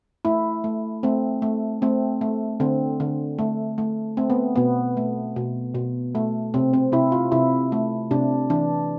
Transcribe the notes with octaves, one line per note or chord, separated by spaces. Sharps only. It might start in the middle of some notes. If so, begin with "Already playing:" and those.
A3 E4
A3
A3 C4
A3
A3 C4
A3
D3 C4
D3
A3
A3
A3 C4
B3
B2 B3
A3
B2
B2
A3
C3 C4
C4
C3 E4
F4
C3 E4
A3
C3 D4
E3 D4